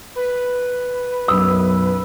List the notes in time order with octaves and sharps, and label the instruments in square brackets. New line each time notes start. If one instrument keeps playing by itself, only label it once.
[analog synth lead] B4
[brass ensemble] B1 F#2 [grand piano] E6